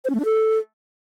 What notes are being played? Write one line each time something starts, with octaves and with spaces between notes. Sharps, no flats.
C5
C#4
A3
D4
A4